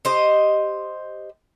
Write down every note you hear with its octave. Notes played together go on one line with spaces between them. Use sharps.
G4 C5 D#5